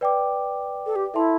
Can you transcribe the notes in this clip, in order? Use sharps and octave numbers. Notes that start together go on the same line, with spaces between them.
B4 D5 G5 D6
A4
G4
E4 A4 E5 A5 C6